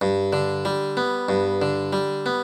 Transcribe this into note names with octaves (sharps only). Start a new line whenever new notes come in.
G2
D3
G3
B3
G2
D3
G3
B3